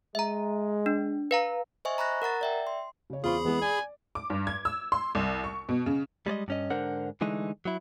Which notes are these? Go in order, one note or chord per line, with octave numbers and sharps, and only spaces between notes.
G#3 E5 A#5
D4
B4 F5 A#5
C5 D#5 E5 G#5 C#6
A#5 B5 C#6 F#6 A#6
A#4 F#5 A#5 A6
D5 E5 G5
C6
C#3 C#5
E2 F4 G#4 C5 B5 C#6
E3 G#3 B3 E4
D5 G#5
D6
G2
G#6
E6
C6
C2
C#6
B2
C#3
G3 G#3 D5 D#5
G2 C#4 D#5
G#2 D3 D4 A#4 C5 F#5
D3 E3 G#3 A3 D#4
F#3 E4